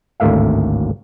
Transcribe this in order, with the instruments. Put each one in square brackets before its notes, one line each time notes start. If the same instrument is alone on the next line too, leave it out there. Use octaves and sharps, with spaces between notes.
[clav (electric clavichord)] G#1 D2 A2 A#3 E5 F5